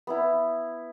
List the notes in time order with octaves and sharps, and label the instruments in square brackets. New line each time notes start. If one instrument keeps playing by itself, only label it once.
[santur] B3 E4